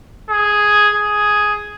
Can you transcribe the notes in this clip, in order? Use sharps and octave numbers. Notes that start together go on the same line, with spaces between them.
G#4
G#4